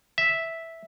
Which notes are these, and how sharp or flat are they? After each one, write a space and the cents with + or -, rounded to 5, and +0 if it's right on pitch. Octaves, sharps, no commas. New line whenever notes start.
E5 -5